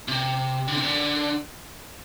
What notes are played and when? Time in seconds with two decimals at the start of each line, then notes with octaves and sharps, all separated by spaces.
0.08 C3
0.68 D3
0.76 C3
0.84 D3